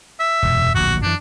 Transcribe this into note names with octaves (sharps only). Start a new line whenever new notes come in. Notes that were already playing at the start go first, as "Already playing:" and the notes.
E5
E1 F#2 A#2
D1 A#1 F#4
F#2 E3 D4